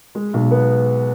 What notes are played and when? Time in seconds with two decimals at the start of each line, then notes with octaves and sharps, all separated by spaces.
0.15 G#3
0.34 B1
0.51 B3